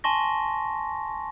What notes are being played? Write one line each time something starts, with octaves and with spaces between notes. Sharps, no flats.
G#5 A5 C6 C#6 A#6